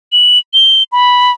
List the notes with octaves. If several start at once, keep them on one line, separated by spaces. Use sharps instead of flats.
F#7
G7
B5